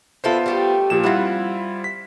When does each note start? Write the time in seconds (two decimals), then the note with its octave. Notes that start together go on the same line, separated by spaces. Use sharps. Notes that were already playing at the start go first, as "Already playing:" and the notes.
0.24 D3 B3 E4 F4 A4 C5
0.46 G3 A3 G4
0.90 A#2 F3 E7
1.04 G3 C4 E4 F4 F#5
1.84 B6